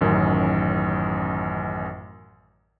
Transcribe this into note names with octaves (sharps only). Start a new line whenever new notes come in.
A1 F#2 D#3 C#4